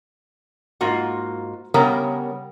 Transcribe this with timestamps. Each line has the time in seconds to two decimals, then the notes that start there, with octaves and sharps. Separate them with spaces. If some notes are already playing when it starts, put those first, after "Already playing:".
0.81 G#2 A#3 F4 F#4
1.74 C#3 G3 B3 A#4 C#5 A#5